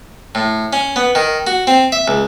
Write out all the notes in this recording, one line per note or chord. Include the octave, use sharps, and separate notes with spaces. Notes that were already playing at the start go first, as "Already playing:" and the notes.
A2
C#4
B3
D#3
F#4
C4
E5
C#2